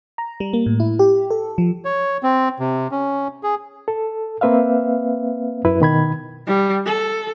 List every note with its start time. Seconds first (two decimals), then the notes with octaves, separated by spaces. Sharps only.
0.18 A#5
0.40 G3
0.53 A#3
0.66 A2
0.80 E4
0.99 G4
1.30 A4
1.58 F3
1.85 C#5
2.23 C4
2.60 C3
2.91 C#4
3.43 G#4
3.88 A4
4.41 A#3 C4 B4 E5 F5
5.65 F#2 E4 B4
5.80 B2 D#3 B5 G#6
6.47 G3
6.87 A4